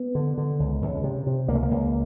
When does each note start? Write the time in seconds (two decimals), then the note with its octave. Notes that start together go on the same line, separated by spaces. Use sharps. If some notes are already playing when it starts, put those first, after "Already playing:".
Already playing: B3
0.15 D3
0.38 D3
0.60 C#2
0.82 C#2
1.04 C3
1.27 C3
1.48 C#2 A#3
1.55 A3
1.63 A#3
1.71 C#2